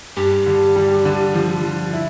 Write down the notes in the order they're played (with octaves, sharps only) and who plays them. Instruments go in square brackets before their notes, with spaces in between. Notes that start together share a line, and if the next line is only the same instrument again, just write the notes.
[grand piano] G2 [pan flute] G4
[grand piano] D3
G3
D3
F3
F3
E4